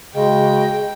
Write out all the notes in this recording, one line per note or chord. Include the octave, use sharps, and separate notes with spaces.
C#3 G#3 F#4 G#4 D#5 G5